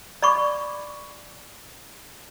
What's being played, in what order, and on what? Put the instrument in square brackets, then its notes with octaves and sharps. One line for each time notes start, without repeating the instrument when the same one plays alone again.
[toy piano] D5 B5 C#6 D6